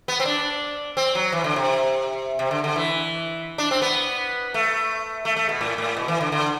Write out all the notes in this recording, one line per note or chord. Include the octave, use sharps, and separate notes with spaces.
B3
C4
D4
C4
F#3
E3
D3
C3
C3
D3
D3
E3
D4
C4
B3
A3
A3
A3
B2
A2
A2
B2
E3
D3
D3